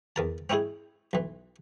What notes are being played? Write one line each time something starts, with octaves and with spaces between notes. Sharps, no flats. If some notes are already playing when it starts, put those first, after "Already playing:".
E2 A#4 A5
C4 C#4 D#4 E4 G#4
B1 E3